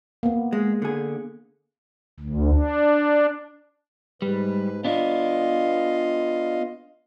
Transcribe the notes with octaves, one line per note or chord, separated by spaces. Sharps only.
A#3 B3
G#3
D3 G#4
D2
D4
G#2 G3 B4
B3 D4 F4 D#5 F5